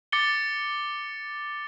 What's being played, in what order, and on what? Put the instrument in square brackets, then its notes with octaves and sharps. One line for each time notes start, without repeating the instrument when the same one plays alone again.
[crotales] D6 A6 C#7 G7